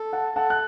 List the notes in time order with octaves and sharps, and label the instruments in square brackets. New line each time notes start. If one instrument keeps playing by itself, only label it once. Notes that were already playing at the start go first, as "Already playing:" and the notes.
Already playing: [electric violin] A4
[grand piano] F#5 A5
[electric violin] A4 [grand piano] F#5 A5
[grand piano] F#6